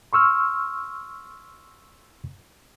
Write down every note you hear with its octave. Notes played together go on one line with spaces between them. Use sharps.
C6 C#6 E6 F6